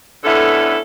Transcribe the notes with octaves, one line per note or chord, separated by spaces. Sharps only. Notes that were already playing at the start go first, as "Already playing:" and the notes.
D3 B3 C#4 E4 A4